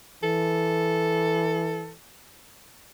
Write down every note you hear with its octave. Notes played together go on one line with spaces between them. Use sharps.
E3 A4